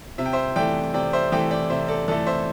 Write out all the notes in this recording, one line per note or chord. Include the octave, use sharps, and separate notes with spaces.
C3 E5
G5
C5 E5
E3 A3 D5 G5
C3 D5 G5
C5 E5
E3 A3 D5 G5
D5 G5
C3 C5 E5
A4 D5
E3 A3 A4 D5
C5 E5